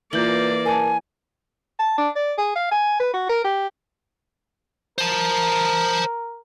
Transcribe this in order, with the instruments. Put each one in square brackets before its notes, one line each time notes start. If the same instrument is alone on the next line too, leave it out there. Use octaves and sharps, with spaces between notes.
[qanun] E3 [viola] A#3 D5 [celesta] F4 G6 F#7
[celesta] A#4 A5 [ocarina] G#5
[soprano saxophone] A5
D4
D5
G#4
F5
G#5
B4
F#4
A#4
G4
[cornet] A#4 [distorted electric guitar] C5 A5